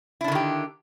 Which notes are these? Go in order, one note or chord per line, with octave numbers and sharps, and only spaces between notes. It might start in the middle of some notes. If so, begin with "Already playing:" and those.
D3 D#3 D4 E4 G4